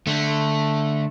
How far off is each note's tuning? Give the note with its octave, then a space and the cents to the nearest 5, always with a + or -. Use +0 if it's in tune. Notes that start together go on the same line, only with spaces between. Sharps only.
D3 +0 A3 +0